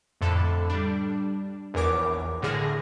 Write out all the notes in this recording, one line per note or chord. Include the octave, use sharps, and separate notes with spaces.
F2 A2 D3 A4 B5
G3 D4
A#1 E2 E3 A#4 C#5 D6
A2 D3 G#4 F6 A#6